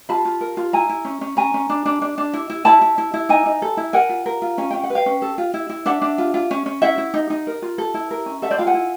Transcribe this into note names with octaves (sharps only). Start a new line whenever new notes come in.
F4 A5 B5
F4
A#4
F4
E4 G#5 A#5
E4
C#4
C#4
C#4 G#5 A#5
C#4
D4
D4
D4
D4
E4
E4
E4 A5 B5
E4
E4
E4
D#4 G#5 A#5
D#4
A4
E4
A#4 F#5 G#5
F4
A#4
F4
C#4 G#5
C#4 G5
F#5
B4
F5 G5
C#4
A4
F4
E4
E4
D4 E5 F#5
D4
F4
F4
C#4
C#4
E4 E5 F#5
E4
D#4
D#4
A#4
F4
A4
E4
A#4
C#4
A4 E5 F#5
C5 D5
F4 F5 G5
F#5 G#5
E4